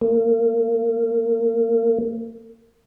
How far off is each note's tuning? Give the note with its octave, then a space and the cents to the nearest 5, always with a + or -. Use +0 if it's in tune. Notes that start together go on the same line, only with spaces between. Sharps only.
A#3 -30